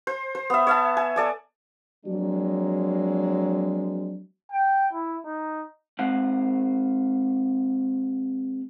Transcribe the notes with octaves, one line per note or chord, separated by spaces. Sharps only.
C5
C5
B3 E5
C#5 E5 A5
G#5
A4 D5 G#5
F3 F#3 G#3 A#3 C4 D4
G5
E4
D#4
G#3 C4 C5 F5 F#5